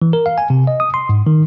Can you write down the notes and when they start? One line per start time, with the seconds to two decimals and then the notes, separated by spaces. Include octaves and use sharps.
0.02 E3
0.13 A#4
0.26 F5
0.38 G#5
0.50 C3
0.67 D#5
0.80 D#6
0.94 C6
1.09 G#2
1.27 D#3